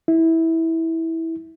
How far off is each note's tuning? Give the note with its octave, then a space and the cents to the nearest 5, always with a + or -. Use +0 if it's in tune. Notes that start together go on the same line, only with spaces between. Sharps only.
E4 -15